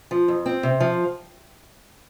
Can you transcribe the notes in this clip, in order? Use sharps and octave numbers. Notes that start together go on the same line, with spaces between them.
F3
F2
C4
C3
F3